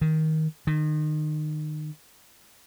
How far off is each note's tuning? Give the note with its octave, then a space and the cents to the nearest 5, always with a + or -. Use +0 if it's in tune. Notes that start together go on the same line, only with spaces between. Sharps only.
D#3 +15
D#3 -30